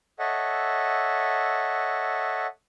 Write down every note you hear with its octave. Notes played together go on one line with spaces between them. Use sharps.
A4 C#5 D#5 E5 F#5